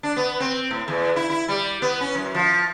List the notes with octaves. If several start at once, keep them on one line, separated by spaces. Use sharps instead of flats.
D4
B3
C4
A2
E2
E4
E4
G3
B3
C#4
F#2
F3